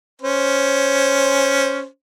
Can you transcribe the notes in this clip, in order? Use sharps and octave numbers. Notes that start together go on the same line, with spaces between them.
C#4 C5